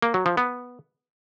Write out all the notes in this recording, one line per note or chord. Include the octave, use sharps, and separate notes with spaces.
A#3
F#3
F3
B3